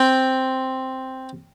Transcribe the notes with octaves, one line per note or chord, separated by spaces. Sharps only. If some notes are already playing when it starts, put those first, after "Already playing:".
Already playing: C4 C5